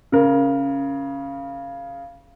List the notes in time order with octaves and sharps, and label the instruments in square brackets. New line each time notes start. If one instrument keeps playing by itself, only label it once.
[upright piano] C#3 A#4